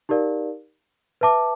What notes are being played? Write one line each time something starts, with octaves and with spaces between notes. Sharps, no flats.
D#4 G4 A#4 D5 F5
B4 E5 A5 D6